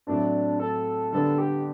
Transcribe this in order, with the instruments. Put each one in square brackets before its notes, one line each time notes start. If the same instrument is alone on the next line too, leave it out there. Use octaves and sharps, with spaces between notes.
[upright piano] A2 F#3 C4 E4 [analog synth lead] D4
[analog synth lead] A4
[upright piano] D3 G3 B3 D4 [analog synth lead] A4
[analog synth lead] G4